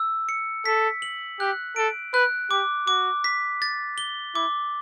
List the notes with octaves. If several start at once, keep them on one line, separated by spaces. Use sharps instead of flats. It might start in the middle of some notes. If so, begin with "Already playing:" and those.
Already playing: E6
C#7
A4 B6
F#7
G4 F#6
A4 D7
B4 F#6
G4 D6
F#4 D6
B6
A6
G7
E4 D6